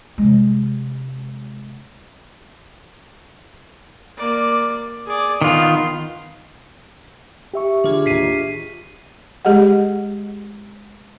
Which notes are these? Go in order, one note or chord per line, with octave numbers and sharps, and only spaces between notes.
C3 G#3
A#3 D5
G#4 D5
D#3 B3 F4
G4 E5 C#6
D3 D4 F4 G#4
D#2 A2 B6 C7 D#7
G#3 G4 G#4 D#5 F#5